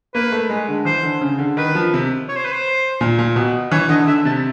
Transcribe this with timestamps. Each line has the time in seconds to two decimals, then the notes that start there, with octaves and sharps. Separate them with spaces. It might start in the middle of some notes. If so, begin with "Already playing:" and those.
0.14 A#3 B4
0.32 A3
0.50 G#3
0.68 D3
0.85 E3 C5
1.03 D3
1.21 C#3
1.39 D3
1.57 D#3 B4
1.75 F3
1.94 C3
2.29 C#5
2.36 C5
2.45 B4
2.52 C5
3.01 A#2
3.19 A#2
3.36 B2
3.71 E3 C#5
3.89 D3 D#5
4.07 D3 E5
4.25 C3 A5